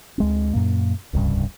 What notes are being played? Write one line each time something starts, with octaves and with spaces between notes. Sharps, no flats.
D2 G#3 C4
F#2 A#2 A#3
D1 C2 G2 C#3